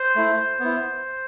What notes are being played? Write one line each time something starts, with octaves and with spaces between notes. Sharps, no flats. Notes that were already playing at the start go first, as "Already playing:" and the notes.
Already playing: C5
A3 E4
B3 E4